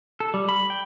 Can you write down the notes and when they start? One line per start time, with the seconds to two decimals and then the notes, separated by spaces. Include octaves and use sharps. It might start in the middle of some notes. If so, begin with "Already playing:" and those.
0.20 A4
0.34 G3
0.49 B5
0.70 G5